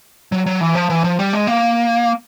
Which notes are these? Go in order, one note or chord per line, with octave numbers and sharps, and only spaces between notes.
F#3
F#3
E3
F3
E3
F3
G3
G#3
A#3